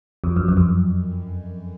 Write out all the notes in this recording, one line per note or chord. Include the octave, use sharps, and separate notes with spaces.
F2
F#2
F#2
F2